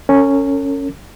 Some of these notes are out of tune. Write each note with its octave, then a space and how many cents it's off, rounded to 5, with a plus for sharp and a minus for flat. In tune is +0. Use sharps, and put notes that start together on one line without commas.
C#4 +0 A#4 -45